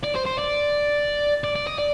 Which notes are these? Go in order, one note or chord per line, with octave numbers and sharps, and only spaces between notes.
D5
C5
C5
D5
D5
D5
D#5
D5